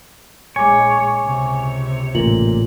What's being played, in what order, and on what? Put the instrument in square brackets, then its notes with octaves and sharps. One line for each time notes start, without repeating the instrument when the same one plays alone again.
[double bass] A#1 G#3 [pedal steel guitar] C#5 [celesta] G#5 D6
[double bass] C#2 C3
[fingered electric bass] A1 A#2 [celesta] F4 F#7